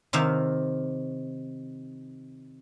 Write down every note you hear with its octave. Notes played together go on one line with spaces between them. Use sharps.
C3 D#3 E5 F5